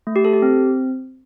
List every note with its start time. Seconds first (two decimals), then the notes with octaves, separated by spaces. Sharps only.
0.07 A3
0.16 G4
0.25 A4
0.33 G4
0.42 C4